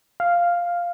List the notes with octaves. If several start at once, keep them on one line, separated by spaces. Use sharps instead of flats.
F5